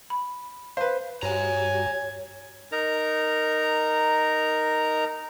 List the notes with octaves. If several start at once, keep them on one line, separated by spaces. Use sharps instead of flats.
B5
B4 C5 F5
G2 F#4 G4 C#5 G#5 A#5 G#6
D#4 A#4 A#5